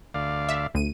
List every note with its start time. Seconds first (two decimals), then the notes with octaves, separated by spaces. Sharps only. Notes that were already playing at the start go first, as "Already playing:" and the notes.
0.14 D2 D5 F5
0.49 E5
0.74 D2 D#7